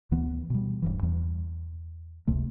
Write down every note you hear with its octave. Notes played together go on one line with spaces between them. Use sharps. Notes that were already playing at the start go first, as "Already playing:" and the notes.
D2 E3 B3
B2 G3
D1 G2 E3
E2
F#1 C#2 C3 A3